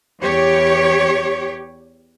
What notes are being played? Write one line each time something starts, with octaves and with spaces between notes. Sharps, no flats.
E2 G4 C#5